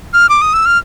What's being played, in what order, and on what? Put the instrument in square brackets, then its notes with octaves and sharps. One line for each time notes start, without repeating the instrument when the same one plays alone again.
[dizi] F6
D6
D#6
E6
F6